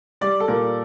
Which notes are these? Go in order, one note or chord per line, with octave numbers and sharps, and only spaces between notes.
G3 D5
A4
A#2 A#4